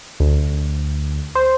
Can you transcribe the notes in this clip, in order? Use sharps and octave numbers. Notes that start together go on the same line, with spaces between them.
D2
C5